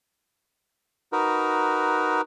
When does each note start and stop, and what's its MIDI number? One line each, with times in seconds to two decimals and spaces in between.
1.13 2.21 63
1.13 2.21 66
1.13 2.21 70
1.13 2.21 71